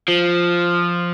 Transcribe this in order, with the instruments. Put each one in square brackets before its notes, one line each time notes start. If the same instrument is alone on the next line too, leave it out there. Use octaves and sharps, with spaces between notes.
[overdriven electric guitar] F3